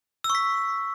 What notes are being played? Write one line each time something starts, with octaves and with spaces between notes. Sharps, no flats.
E6
C#6
B6